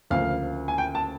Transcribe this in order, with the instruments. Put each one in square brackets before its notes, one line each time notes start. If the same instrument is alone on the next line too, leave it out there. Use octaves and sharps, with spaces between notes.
[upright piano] D2 C#3 F3 A#3 F5
G#5
G5
A5